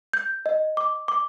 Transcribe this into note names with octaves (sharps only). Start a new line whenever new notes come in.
G6
D#5
D6
D6